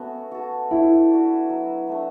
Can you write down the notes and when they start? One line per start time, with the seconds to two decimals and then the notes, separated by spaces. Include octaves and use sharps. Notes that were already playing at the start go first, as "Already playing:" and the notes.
Already playing: A3 B3 C#4 F#4 C#5
0.32 F#4 A4
0.71 D4 E4
1.11 F#4 B4 D5
1.50 F#3
1.89 A3 D4